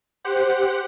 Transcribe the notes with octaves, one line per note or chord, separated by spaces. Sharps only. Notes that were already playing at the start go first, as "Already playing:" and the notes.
G4 C5 F#5